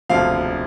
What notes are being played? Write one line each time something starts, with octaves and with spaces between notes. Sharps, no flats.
E1 D2 C3 F3 F5